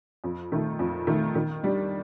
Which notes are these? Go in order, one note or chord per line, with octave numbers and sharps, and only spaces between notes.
F2
D#3 A3
F2
D#3 A3
D#3
G3 D4